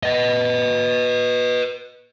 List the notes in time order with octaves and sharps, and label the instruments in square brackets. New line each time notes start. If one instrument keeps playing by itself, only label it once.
[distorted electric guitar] B4 D#5